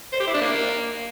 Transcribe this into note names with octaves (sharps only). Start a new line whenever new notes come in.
C5
G4
E4
D4
A#3